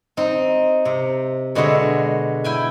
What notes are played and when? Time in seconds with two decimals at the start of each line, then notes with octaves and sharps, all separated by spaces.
0.17 C4 D#4
0.85 C3
1.55 B2 D3 G#3 C#5 E5
2.44 E4 G5 G#5